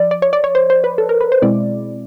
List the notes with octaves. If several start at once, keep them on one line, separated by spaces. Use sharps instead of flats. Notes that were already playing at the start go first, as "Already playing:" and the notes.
Already playing: F3 D5
D5
C#5
D5
C#5
C5
C5
B4
A4
A#4
B4
C5
B2 G#3 C4 E4 D5